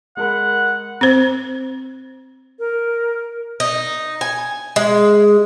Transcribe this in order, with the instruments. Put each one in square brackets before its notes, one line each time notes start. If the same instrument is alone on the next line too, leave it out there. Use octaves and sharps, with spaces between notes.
[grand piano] G#3 A#4 B5 [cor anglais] F#5
[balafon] C4 C5
[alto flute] A#4
[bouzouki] D#4
G#5
G#3